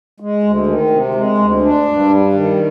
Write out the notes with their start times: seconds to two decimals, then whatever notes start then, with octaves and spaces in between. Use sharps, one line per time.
0.20 G#3
0.43 D2
0.67 D#3
0.90 C3
1.15 G#3
1.38 D2
1.62 D4
1.85 G2
2.09 G3
2.33 D#3